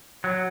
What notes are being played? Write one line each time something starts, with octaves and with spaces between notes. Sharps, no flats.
F#3